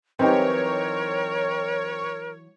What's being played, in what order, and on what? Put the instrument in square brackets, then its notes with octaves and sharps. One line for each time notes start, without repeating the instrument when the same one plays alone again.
[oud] E3 F#3 B4 [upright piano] C4 D#4 G4 [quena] A#4 [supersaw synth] C#5